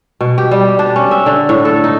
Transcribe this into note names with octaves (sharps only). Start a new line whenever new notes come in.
B2
G4
G3
D4
C#4
E5
D3
A2
A4
D#4